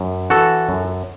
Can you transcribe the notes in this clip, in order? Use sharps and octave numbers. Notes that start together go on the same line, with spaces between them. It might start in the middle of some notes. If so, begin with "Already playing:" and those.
Already playing: F#2
E3 F#4 A4
F#2